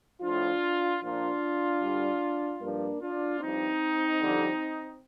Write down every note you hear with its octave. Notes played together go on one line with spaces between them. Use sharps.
A2 F3 D4 F4
A#2 F3 D4 F4
G2 D3 G3
G2 F3 A#3 D4
D4 F4
G2 F3 C4 D#4
F2 D3 G3